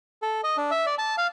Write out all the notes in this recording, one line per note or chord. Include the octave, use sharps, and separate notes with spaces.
A4
D#5
D4
E5
D5
A5
F5